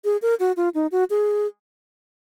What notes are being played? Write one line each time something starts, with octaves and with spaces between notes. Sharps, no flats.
G#4
A#4
F#4
F4
D#4
F#4
G#4